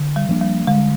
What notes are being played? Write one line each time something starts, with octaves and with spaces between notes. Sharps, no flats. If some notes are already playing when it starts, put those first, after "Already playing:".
Already playing: D3
G3
F3 A#3 D4
G3
D3 G#3